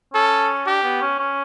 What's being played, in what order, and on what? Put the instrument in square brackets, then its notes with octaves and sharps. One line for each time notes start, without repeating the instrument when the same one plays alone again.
[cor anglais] C#4 [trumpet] A4
[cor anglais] D4 [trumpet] G4
[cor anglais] B3
C#4
C#4